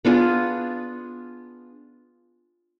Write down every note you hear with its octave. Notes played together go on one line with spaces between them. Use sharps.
B3 D4 F4 G#4